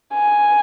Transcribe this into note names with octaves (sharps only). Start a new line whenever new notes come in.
G#5